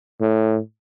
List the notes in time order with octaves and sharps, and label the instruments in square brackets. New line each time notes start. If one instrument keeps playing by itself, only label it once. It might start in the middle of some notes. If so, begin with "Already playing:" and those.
[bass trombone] A2